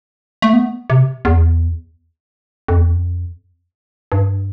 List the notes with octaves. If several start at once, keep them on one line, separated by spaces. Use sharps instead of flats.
A3
B3
C3
E2
F2
E2
F2
G2